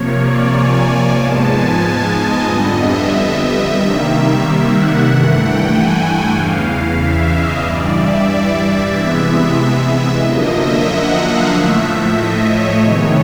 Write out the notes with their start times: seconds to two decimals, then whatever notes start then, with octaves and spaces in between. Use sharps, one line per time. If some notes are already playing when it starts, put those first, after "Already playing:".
Already playing: C3 F3 A#3 C#5
0.17 D5
0.50 G#5
1.14 G#2 F3 G#3 B3 A5
1.46 G#5
2.11 D#5
2.43 F2 D3 G3 B3
2.76 E5
3.40 E5
3.73 C3 D#3 G3 A#3
4.70 F#5
5.02 G2 E3 A3
5.35 G5
5.67 G#5
6.31 E2 C#3 E3 F5
6.64 F5
6.96 E5
7.28 D#5
7.61 G2 E3 G3 D5
7.93 E5
8.90 C3 E3 G#3 B3 E5
9.23 E5
10.19 F#2 D3 F3 A#3 D#5
10.52 E5
10.84 F#5
11.17 F5
11.48 A2 F3 A3 E5
12.14 D#5
12.46 C#5
12.78 C3 D#3 G#3 B3